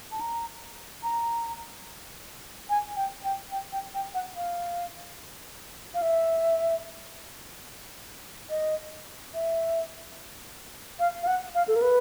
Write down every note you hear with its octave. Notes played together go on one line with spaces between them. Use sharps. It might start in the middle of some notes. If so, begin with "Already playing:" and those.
A5
A#5
A#5
G#5
G5
G5
G5
G5
G5
F#5
F5
F5
E5
D#5
E5
F5
F5
F#5
F5
A4
A#4
B4